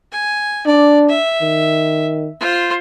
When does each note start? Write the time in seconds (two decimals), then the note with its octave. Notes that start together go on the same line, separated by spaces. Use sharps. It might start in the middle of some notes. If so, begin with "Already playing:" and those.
0.12 G#5
0.66 D4 D5
1.09 E5
1.42 D#3
2.40 F4 C5